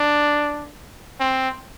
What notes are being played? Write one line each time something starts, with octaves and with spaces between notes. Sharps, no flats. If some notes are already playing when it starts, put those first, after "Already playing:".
Already playing: D4
C4